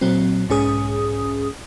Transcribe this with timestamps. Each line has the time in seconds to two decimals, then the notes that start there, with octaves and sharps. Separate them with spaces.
0.01 A#2 F#3 C4
0.49 B1 G#2 C#4 G#4 D#6